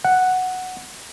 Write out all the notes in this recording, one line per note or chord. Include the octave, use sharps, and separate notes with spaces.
F#5